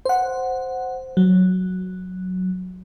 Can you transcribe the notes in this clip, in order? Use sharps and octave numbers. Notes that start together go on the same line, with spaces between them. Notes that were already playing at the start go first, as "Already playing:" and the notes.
C5 F#5
F#3